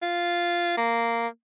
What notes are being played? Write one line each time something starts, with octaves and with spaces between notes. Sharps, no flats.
F4
A#3